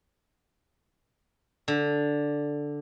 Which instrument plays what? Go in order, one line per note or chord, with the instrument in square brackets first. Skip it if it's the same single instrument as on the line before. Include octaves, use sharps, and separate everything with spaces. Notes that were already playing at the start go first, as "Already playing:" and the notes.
[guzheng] D3